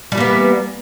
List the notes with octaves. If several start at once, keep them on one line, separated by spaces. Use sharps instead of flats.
E3 G3 A#3 B3